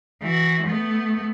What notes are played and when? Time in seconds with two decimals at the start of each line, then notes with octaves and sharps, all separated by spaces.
0.22 E3 F#4
0.67 A3 B3